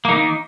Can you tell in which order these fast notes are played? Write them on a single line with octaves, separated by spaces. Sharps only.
A#3 D#4 D#3